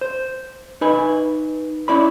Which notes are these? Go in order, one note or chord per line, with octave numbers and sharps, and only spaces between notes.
C5
D#4 B4 G#5
C#4 E4 D5 B5